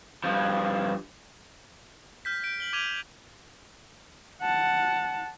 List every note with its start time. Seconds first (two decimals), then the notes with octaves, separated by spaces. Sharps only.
0.24 G2 F3
2.25 F6 G6 B6
2.43 G6 D7
2.60 F#7 G7
2.73 D6 G#6 D7 D#7 F7 G7
4.41 F#5 A5